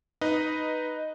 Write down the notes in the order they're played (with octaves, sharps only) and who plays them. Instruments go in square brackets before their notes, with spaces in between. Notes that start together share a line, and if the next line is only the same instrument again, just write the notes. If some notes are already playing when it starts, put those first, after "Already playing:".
[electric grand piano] D#4 B4 D#5